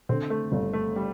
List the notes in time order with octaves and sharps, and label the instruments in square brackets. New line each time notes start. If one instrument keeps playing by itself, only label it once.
[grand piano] D3 [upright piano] C4
[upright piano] A3
[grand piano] G1 [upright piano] A3
[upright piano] A3
G3